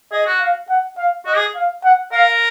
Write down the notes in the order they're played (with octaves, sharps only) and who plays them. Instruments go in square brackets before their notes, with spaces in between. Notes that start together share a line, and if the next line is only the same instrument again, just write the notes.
[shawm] G#4 [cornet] D#5
[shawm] F#4
[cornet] F5
F#5
F5
[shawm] F#4 [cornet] D#5
[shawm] G#4
[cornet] F5
F#5
[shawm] A#4 [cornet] F5